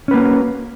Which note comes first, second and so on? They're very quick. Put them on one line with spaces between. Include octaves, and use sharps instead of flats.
C#4 B4 A#3 F#4